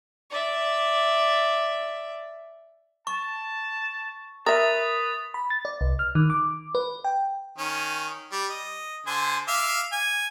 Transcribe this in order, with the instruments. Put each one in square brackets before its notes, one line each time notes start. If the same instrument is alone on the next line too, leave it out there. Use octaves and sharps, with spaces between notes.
[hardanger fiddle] D5 E5
[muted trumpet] A5 [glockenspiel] C#6
[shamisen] A#4 E5 [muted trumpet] B4 [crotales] D#6 A6
[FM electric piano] B5
A6
D5
C2
F6
D#3
D6
B4
G5
[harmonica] D#3 C#4
G3
D#5
D3 C5 G#5
E5 F5 D6
G#5